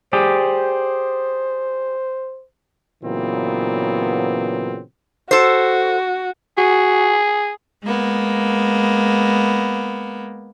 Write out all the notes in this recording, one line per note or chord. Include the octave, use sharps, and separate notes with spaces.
G4 G#4 C5 D5
A#2 C#3 E3 F#3 B3 C4
F#4 A4 C5
F#4 G#4
G#3 A#3 B3